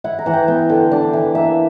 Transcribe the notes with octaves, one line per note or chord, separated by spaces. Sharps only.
E4 F#5
A#5
E3 F#5
G5
B3 G5
D3
D4
E3
A#3 E5